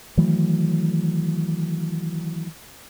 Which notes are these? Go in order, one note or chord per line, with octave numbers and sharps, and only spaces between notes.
D#3 E3 F#3 A3